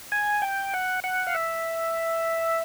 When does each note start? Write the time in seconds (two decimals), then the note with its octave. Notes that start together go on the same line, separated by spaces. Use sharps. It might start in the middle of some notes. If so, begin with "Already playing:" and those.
0.12 G#5
0.42 G5
0.74 F#5
1.04 F#5
1.27 F5
1.35 E5